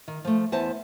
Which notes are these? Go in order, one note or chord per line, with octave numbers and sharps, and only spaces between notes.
D#3
F3 A3
E2 B3 C5 A5